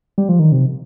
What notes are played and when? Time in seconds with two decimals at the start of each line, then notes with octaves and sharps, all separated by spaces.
0.18 G3
0.29 F3
0.39 D#3
0.52 C3